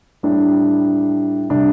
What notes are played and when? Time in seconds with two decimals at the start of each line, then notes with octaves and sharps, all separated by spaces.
0.23 A2 G3 D4
1.50 C3 G3 D4